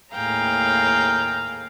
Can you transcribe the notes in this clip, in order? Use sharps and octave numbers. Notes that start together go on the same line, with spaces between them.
D#2 A2 G#4 F5 G5 A#5